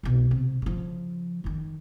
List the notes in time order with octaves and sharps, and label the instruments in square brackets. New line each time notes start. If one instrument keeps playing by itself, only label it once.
[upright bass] C2 B2
C3
C#3 F3
F#2 D#3